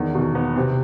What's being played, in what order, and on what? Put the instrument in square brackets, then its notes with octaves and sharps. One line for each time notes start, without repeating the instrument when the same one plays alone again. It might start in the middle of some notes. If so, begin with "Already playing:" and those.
Already playing: [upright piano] E2 D#3
B2
B3
C3